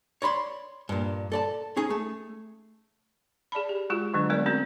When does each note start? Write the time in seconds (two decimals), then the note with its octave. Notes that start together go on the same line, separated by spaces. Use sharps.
0.22 C#5 D5 B5 C6
0.89 G2 A#2
1.32 A4 D5 A5
1.76 C#4 D#4 G#4
1.90 A3
3.52 G#4 D5 A5 B5
3.69 G4
3.90 G#3 F4 F#4 G#4
4.14 D3 F#3 G#3 D4
4.30 G3 G#3 B3 A#4 D5
4.46 A3 C4 C#4 F#4 A#4